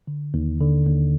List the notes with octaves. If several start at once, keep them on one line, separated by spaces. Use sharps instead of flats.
D3
D#2
D3
D#2